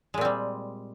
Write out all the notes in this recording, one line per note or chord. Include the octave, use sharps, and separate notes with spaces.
A#2 G3 G#3 C4